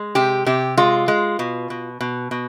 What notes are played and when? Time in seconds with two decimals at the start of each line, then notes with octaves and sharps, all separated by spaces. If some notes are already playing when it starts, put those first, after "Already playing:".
Already playing: G#3
0.15 C3 G4
0.46 C3 G4
0.77 G#3 F4
1.08 G#3
1.39 B2
1.70 B2
2.01 B2
2.31 B2